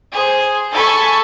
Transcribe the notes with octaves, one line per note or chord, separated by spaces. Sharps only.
G#4 C5
A4 G#5 B5 C#6